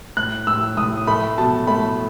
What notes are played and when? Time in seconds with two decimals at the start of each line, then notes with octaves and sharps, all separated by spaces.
0.17 A2 F#6
0.47 A2 E6
0.77 A2 D#6
1.07 A3 B5
1.38 B2 A5
1.67 A3 B5